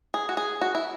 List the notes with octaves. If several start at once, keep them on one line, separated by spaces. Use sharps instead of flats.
G#4
F#4
G#4
F#4
E4